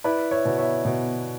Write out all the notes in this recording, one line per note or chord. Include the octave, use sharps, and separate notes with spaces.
E4 B4 D5
C#5 E5
B2
C#5 E5
B2